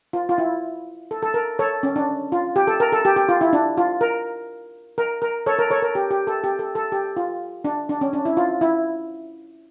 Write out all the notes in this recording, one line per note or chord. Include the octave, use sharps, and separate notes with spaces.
F4
F4
E4
A4
A4
A#4
A4 C#5
C#4
D4
F4
G4
A4
A#4
A4
G4
G4
F4
E4
D4
F4
A#4
A#4
A#4
A4 C#5
A#4
A4 C#5
A#4
G4
G4
A4
G4
A4
A4
G4
F4
D4
D4
C#4
D4
E4
F4
E4